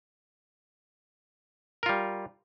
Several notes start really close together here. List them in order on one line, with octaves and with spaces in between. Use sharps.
A#4 F4 G3